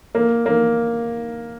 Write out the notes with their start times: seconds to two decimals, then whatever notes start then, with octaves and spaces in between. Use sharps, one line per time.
0.15 A#3
0.46 A#3